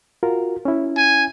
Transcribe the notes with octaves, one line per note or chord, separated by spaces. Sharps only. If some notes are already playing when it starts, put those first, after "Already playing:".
F4 F#4 A#4
C#4 E4
G#5